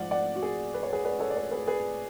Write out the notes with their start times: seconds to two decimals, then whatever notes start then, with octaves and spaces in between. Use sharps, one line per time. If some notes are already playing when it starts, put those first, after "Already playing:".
Already playing: G#2 F3 D5 F#5
0.11 D5 F#5
0.36 F#4
0.42 G#4
0.74 B4
0.83 C#5
0.93 G#4 B4
1.05 B4 D5
1.20 A4 C#5
1.30 D5
1.36 A4 C#5
1.51 G#4 B4
1.67 G#4 B4